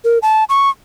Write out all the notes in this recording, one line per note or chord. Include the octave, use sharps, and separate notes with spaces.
A#4
A5
C#6